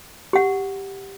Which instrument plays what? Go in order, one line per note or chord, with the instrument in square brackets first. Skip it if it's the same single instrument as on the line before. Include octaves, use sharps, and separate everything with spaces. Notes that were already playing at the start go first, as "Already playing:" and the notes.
[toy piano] G4 F#5